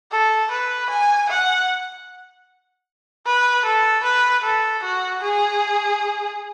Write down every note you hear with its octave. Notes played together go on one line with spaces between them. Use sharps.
A4
B4
G#5
F#5
B4
A4
B4
A4
F#4
G#4